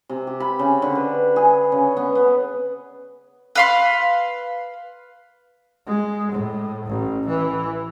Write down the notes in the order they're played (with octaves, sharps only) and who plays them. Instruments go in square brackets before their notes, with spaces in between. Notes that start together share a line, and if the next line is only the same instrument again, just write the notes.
[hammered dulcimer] C3
G4
B5
C#3
D3
B4
G#4
C#3
B3
B3
[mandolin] B4 F5 C6
[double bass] G#3
A2
A1
E3